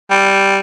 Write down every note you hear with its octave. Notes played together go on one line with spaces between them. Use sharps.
G3